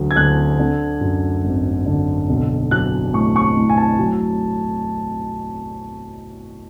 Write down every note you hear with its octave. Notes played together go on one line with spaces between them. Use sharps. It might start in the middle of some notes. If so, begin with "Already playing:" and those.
Already playing: D2 D3 F#3
G#6
D2 F#6
D3
F#2
G#1
D3
B1
F#3 F#6
A2 C#6
C#6
A2
G#5
A5
F#3